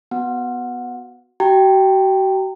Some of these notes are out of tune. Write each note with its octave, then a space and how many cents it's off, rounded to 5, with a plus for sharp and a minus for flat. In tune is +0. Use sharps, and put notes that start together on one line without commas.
B3 +0 F#4 +0 F#5 -15
F#4 +40 G5 +0 A#5 -35